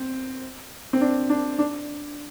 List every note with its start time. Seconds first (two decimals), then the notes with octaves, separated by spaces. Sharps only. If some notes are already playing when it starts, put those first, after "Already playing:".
Already playing: C4
0.93 C4
1.01 D4
1.30 D4
1.59 D4